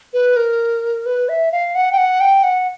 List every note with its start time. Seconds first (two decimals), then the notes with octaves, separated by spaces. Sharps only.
0.14 B4
0.36 A#4
1.06 B4
1.29 E5
1.52 F5
1.75 F#5
1.92 G5
1.98 F#5
2.20 G5
2.43 F#5